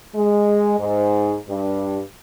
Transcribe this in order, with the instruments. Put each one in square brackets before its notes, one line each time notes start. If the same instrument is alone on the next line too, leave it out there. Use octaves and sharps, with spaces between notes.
[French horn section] G#3
G#2
G2